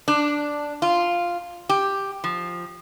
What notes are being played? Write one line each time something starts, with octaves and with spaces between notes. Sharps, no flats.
D4
F4
G4
F3